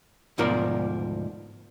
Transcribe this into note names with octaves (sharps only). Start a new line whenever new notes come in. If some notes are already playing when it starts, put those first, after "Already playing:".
D2 G#2 B2 F3 A#4 D5